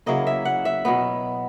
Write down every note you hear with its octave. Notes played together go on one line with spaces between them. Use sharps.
C#3 F#3 A#3 E4 D#5
E5
F#5
E5
B2 F#3 B3